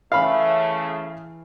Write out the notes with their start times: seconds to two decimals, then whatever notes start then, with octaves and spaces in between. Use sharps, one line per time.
0.12 C#3 E3 A3 F5 B5